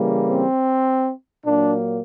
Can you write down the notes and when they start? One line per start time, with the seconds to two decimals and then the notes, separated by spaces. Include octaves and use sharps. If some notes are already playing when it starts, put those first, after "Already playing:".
Already playing: C#3 E3 G3 A#3
0.29 C4
1.46 A#2 F#3 A#3 D4